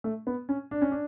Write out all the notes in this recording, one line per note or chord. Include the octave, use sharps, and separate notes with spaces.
A3
B3
C#4
D4
C#4
D4